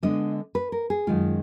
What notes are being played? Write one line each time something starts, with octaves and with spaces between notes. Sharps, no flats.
D3 G#3 B3 D4 D#5
B4
A#4
G#4
F#2 D#3 G#3 F4